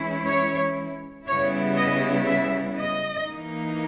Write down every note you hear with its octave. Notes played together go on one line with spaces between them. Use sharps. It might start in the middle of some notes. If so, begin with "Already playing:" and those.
Already playing: E3 G#3 C#4 E4
C#5
C#3 G3 B3 E4 C#5
D#5
E5
D#5
E3 A#3 D#4